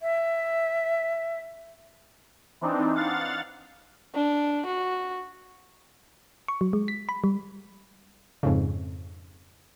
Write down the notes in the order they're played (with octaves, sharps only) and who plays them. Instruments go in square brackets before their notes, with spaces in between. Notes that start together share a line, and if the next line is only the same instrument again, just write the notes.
[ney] E5
[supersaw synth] E3 C4 D4 D#4
F5 F#5 A6
[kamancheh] D4
F#4
[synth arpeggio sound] C#6
F#3
G#3
B6
B5
G3
F2 G#2 C#3